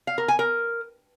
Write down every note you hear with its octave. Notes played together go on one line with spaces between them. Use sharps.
F5
A#4
G#5
A#4